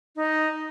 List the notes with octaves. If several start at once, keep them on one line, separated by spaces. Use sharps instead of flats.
D#4